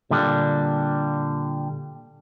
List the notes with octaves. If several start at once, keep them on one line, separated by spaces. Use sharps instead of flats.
A#2 D3 G3 D4